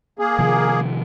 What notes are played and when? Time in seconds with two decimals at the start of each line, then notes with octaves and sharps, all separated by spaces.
0.19 A#3 G#4
0.39 C3 D#3 F3